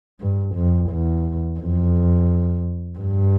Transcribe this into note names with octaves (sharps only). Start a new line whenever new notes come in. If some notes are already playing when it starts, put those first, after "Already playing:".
G2
F2
E2
F2
G2